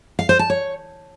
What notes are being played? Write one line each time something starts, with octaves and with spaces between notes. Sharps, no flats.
F5
C5
A5
C#5